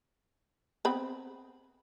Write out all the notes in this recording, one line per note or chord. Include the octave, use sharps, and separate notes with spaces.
B3 C4 B5